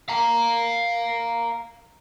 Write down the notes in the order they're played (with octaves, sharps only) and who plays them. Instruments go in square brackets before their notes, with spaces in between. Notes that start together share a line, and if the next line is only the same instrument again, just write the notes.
[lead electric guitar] F5 A#5